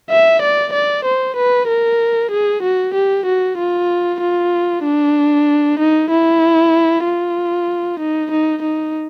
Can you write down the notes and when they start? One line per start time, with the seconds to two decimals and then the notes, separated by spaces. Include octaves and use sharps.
0.10 E5
0.42 D5
0.73 D5
1.05 C5
1.36 B4
1.69 A#4
2.31 G#4
2.63 F#4
2.94 G4
3.26 F#4
3.58 F4
4.20 F4
4.84 D4
5.79 D#4
6.11 E4
7.05 F4
8.00 D#4
8.32 D#4
8.62 D#4